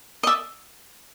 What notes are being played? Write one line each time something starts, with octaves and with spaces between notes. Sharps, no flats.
D#5
D5 E5